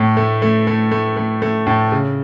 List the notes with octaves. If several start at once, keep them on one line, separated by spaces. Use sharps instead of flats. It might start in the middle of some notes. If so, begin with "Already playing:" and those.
Already playing: A2
A3
A3
A3
A3
A3
A3
A2
C#3